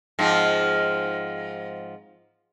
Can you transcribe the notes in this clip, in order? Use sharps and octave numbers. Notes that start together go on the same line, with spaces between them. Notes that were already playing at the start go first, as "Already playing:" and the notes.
G#2 F3 C4